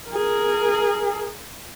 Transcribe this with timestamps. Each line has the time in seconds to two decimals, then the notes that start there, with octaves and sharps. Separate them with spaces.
0.10 G#4 A#4